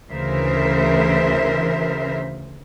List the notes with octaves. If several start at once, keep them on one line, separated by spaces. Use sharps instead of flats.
D2 C#3 E3 A#4 C5 E5